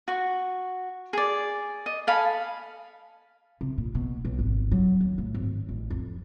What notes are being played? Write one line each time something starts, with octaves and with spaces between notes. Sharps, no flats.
F#4 C#6
G#4 D5
D#5
A4 F5 G#5 B5
C3
A#2
B2
B1
G#1
F#3
D#2
A2
G#1
A1
F2